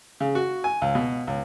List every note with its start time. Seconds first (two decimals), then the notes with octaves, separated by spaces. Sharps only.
0.20 C#3
0.35 F#4
0.64 G#5
0.82 C#2
0.95 B2
1.27 C#2